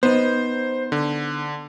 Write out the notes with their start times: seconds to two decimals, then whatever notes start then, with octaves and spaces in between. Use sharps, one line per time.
0.03 B3 D#4 C5
0.92 D3